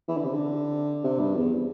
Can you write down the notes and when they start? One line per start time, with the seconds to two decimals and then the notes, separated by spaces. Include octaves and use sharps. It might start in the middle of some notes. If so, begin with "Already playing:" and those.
0.08 E3
0.17 D3
0.25 C3
0.33 D3
1.04 C3
1.19 G2
1.35 E2